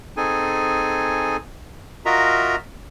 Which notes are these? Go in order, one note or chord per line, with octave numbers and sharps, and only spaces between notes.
C4 D#4 G#4 A4 G#5
F4 F#4 A#4 D#5 E5 A#5